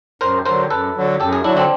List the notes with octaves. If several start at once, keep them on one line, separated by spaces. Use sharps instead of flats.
F#2 A#4 C5
D3 F#3 A#4 C5
F#2 A4 B4
D3 F#3
F#2 G4 A4
G#4 A#4
D3 F#3 D4 E4
C4 D4